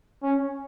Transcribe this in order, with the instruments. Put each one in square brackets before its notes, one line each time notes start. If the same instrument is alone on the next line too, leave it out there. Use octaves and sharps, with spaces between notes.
[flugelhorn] C#4